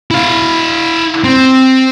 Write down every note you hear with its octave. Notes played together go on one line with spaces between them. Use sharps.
E4 F5
C4